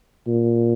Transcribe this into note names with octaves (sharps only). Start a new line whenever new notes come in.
A#2